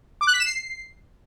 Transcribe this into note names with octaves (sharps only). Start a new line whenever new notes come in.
D6
F#6
B6
E7
C7